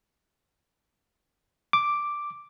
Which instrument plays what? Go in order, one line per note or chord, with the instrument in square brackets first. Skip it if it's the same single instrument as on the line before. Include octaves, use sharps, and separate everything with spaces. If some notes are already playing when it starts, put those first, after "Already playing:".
[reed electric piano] D6